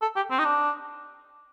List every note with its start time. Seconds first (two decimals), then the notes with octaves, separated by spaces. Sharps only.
0.02 A4
0.16 G4
0.31 C4
0.39 D#4
0.45 D4